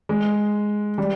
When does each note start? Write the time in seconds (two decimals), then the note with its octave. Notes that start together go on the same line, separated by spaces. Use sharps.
0.09 G#3
0.98 G3